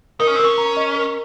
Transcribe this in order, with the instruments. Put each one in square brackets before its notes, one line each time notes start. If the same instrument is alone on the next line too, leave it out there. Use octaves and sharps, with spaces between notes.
[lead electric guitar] D#4 [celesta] A#4
[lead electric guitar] C#4
C4
[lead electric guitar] C#4 [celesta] A#4
[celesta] A#5
D#5
A#4